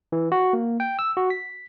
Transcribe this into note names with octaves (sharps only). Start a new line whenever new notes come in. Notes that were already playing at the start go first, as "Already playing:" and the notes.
E3
F#4
A#3
G5
E6
F#4
B6